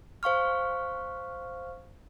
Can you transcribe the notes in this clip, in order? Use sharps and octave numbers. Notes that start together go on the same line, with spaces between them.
C5 F5 C#6 F6